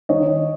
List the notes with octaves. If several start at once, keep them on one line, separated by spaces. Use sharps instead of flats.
D#3 C#5 D#5